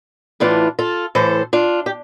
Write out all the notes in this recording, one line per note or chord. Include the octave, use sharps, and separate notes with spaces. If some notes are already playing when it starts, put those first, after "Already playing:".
A2 E3 D4 F4
F4 A4
A2 E3 A4 C5
D4 F4
G4